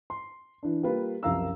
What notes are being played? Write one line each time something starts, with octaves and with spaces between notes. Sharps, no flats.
C6
E3 D4
G3 A#3 F4 B4
C2 F#2 F3 F5 A#5 E6